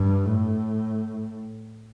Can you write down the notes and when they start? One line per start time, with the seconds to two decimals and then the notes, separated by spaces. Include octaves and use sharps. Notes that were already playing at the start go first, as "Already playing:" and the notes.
Already playing: G2
0.26 A2